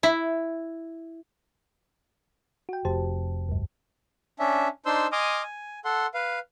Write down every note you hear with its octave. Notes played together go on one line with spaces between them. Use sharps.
E4
F#4 G5
F1 G4 C5 A5
D2 G2
C#4 D4 E5
D4 D#4 C5 C6 E6
D#5 G#5 C6 D6 D#6 F6
G#5
A4 F#5 C6
B4 F5